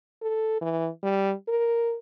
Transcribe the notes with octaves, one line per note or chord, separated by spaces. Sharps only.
A4
E3
G3
A#4